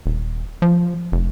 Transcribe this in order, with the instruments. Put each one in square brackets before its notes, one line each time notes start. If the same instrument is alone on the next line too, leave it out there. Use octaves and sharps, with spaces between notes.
[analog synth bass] D#1
F3
F1